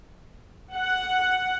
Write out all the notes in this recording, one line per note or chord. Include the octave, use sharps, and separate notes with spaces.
F#5